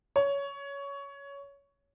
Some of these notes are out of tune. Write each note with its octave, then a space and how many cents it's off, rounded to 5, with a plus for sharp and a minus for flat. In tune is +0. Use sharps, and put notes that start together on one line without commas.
C#5 +15